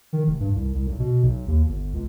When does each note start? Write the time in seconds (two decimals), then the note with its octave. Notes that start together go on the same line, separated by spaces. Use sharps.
0.13 D#3
0.27 F1
0.40 G2
0.55 C2
0.75 C2
0.87 B1
0.99 B2
1.23 B1
1.47 D#2
1.68 G1
1.94 C#2